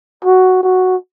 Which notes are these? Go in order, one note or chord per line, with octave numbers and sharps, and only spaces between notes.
F#4
F#4